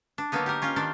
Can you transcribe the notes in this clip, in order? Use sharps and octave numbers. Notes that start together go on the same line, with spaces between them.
D4
D3 F#3 A#3 B3 D#4
G4 A#4
C#4 F4
D#3 D4 D5